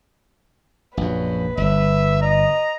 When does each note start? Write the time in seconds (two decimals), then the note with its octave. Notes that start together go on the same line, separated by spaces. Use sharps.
0.97 A#1 F#2 B4
1.57 G1 E5
2.22 D#5 A#5